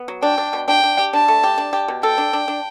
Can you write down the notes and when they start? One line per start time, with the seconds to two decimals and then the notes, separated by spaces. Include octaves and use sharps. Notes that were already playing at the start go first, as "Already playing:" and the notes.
Already playing: B3
0.08 F#3
0.23 D4 G5
0.38 D4
0.53 B2
0.68 D4 G5
0.84 D4
0.99 G4
1.13 D4 A5
1.28 A3
1.43 G4
1.58 D4
1.73 G4
1.88 B2
2.03 A4 G5
2.18 D4
2.33 D4
2.48 D4